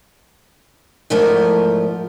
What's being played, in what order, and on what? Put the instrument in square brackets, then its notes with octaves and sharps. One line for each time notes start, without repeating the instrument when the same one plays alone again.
[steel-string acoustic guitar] E2 G#2 F3 A3 A#4